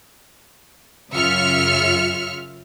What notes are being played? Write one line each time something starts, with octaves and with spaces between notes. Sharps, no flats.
F#2 C#3 F4 E5 F6 C#7